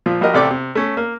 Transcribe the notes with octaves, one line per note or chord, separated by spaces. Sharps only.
A#2 F3
A#1 F#4 G4 A#4 D#5
A1 C3 A4 D5 G5 D6
C3
A3 C#4
A#3